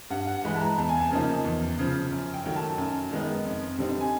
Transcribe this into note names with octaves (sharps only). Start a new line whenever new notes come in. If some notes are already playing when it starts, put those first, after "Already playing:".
G2 F#5
F#5
E3 G#3 B5
A5
A#5
E2 A5
G#5
A5
C#3 F3 A#3 D#4
E2
C#3 F3
F#2
G5
D#3 F#3 A3
A5
F#2
D#3 G#3 B3 D#4
F2
D3 G3 C4 D#4
G#5